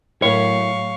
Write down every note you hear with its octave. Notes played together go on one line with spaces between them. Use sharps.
A2 F#3 E4 A#4 C#5 F5 C#6